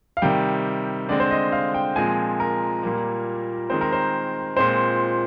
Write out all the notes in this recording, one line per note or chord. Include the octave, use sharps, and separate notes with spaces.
F5
C3 D#3 G3 G5
D3 G#3 C4 D5
C5
D#5
F5
G5
A#2 F3 G#3 C4 G#5
A#4
A#2 G3 A#3
D#3 G#3 C4 C5
A#4
C5
A#2 G#3 C4 C5